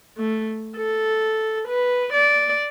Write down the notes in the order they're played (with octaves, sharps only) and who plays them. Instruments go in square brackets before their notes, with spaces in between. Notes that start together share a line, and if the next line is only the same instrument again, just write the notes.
[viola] A3
A4
B4
D5